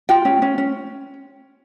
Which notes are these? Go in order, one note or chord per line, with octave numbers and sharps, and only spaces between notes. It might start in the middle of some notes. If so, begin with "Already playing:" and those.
F4 G5
C#4
C#4
C#4